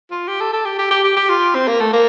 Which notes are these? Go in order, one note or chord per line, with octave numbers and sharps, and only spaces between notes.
F4
G4
A4
A4
G4
G4
G4
G4
G4
F4
C4
A#3
A3
A#3